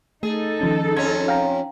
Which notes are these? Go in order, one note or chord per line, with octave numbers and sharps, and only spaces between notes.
A3 D#4 G#4 A4
D#3 F3 C#4
F2 C#4 G#6
F5 G5 A#5